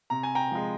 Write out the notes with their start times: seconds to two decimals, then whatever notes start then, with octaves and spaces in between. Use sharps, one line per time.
0.10 C3 A#5
0.23 G#5
0.35 G5 A#5
0.52 F3 G#3